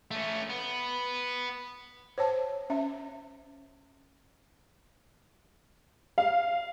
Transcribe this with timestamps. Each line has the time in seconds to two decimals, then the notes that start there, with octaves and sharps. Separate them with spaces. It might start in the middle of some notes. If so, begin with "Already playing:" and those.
0.11 A3 C#4
0.50 B3
2.18 C5 C#5 A5
2.70 C#4 E5
6.18 F5